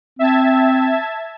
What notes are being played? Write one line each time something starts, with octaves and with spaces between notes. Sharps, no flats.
C4 E5 A5 G#6